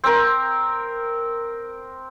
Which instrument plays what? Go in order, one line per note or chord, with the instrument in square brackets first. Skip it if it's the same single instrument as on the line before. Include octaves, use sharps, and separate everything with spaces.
[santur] C4 A#4